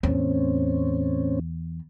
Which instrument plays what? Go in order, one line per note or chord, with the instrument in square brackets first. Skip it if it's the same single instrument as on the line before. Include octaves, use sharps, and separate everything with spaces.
[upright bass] E2 [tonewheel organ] A2 C4 C#4